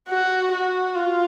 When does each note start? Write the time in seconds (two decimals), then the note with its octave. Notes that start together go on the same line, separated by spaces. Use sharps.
0.09 F#4
0.52 F#4
0.95 F4